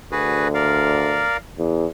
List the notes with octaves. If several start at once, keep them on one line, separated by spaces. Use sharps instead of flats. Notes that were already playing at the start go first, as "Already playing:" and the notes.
D2 F#4 G#4 B4
A#4 D5 F5
E2